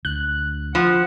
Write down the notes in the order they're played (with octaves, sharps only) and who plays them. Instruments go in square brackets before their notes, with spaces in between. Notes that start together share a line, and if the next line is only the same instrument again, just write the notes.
[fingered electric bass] D2 [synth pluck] F#6
[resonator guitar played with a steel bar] F3 [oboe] F#5